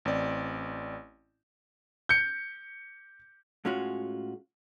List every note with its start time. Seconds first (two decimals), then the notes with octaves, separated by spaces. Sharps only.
0.05 A1 C4 D5
2.09 G6 C#7
3.65 A2 G#3 C#4 F4 F#4